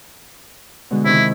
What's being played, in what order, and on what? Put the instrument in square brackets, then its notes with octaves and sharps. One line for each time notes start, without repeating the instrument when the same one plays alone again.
[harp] B2 D3 G#3
[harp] C3 D#3 D#4 [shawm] E4